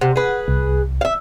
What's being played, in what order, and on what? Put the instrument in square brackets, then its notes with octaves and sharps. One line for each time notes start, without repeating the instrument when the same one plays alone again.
[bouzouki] C3 [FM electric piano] F#5
[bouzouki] G#4 B4
[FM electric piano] C2
[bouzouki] E5 F5